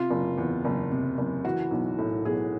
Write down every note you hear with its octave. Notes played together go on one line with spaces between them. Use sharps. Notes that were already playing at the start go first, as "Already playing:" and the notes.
Already playing: C3 F4
F#1
E2
F#1
C3
F#1
E3 F#4
B1
A2
B1 G#4